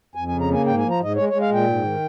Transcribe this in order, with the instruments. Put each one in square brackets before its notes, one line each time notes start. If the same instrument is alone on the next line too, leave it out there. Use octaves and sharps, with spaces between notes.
[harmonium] F2 G#5
G#5
C#3
A#5
A#3 G#5
G#2 G5
G#5
F3
A#5
G#2 D#5
G#3 C#5
G#3 C#5
F5
A#2 G5
G#2
D#3